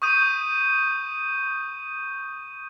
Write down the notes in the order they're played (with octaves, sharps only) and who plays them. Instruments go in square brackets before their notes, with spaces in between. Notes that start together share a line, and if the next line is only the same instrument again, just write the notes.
[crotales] C#6 D#6 G6 D#7